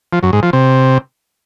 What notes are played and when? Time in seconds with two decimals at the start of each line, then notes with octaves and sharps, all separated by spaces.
0.13 F3
0.23 F#2
0.33 G#2
0.43 F3
0.53 C3